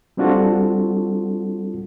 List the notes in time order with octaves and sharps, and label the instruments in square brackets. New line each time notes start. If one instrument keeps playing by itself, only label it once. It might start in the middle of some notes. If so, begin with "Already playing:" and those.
[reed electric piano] G3 C4 D4 F4 F#4 A4